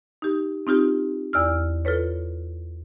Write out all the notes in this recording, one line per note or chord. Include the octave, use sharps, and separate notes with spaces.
D#4 G4
C4 D#4 F4 G4
E2 D5 E6 F6
F4 A4 B4 C#5